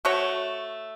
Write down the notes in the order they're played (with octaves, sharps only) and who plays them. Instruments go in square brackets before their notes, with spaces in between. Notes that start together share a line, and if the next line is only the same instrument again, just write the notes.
[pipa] A3 F#4 C#5